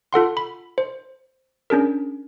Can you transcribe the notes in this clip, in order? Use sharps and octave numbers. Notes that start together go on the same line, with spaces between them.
F4 A4 F#5 C6
B5
C5
C#4 D4 G#4 A#4